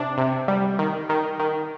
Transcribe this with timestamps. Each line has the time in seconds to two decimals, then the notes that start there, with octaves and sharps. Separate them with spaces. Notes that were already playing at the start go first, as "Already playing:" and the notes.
Already playing: C3 D4
0.18 C3
0.48 G3
0.79 D#3
1.09 D#3
1.40 D#3